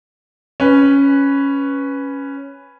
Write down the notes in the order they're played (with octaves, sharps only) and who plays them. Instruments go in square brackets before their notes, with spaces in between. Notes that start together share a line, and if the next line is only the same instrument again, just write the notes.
[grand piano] C#4 B4